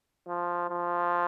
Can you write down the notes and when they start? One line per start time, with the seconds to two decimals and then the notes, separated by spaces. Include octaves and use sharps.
0.28 F3
0.70 F3